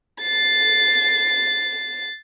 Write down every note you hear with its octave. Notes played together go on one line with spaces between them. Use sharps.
A6 C7